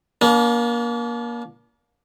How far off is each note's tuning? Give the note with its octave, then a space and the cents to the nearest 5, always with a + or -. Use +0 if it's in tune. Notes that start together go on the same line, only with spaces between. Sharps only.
A#3 +25 D4 -40